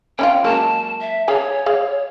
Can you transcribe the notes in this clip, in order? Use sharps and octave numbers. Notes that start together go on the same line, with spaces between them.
C#4 E4 F4 G5
F#3 G#3 A#3 A5
E5
G#4 C#5 F5 G#5
G#4 F5